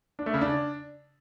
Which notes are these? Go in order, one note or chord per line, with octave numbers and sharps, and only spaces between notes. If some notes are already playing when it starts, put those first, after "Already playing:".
D4
A3
C#3
D4